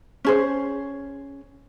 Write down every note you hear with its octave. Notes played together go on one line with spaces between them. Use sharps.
C#4 G#4 C5